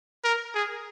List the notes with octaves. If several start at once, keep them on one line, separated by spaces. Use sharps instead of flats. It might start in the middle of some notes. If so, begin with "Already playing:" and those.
A#4
G#4